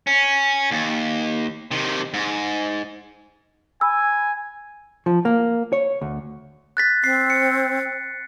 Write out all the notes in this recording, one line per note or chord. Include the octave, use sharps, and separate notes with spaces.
C#4
D#2
C3 D#3
G#2
G#5 B5 E6
F3
A#3
C#5
D2
F#6 A6 B6
C4 C7
C#7